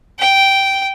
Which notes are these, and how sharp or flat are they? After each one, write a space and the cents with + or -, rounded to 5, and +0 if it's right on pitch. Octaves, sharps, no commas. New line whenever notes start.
G5 -10